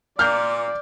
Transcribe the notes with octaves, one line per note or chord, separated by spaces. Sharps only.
A#2 D5 F6 G6